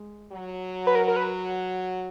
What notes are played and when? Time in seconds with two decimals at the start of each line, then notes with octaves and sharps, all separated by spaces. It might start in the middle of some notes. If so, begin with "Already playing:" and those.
Already playing: G#3
0.32 F#3
0.87 B4
0.95 A#4
1.08 A#4
1.16 B4